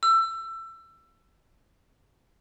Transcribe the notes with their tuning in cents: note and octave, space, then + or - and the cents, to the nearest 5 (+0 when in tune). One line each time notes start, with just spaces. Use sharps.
E6 +20